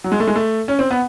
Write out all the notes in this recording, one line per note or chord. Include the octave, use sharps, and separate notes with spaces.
F#3
G#3
A3
G#3
A3
C#4
C4
B3